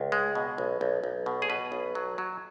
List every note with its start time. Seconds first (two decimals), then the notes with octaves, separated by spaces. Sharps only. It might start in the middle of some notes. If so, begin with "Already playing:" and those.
Already playing: C#2
0.12 G#3
0.35 B2
0.58 B1
0.81 B1
1.04 B1
1.26 B2
1.42 G#4
1.50 B2 B4
1.72 B1
1.95 F#3
2.18 F#3